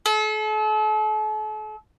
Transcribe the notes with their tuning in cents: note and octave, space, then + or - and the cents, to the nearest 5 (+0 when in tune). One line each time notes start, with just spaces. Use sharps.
A4 -40